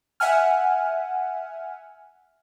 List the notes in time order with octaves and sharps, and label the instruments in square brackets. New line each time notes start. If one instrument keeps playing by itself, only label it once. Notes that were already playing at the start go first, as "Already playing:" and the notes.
[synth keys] E5 F#5 G#5 F6